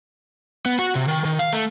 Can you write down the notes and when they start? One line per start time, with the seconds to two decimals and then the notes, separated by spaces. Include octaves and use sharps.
0.66 B3
0.79 F#4
0.95 C3
1.08 D#3
1.25 D#3
1.39 F5
1.53 A3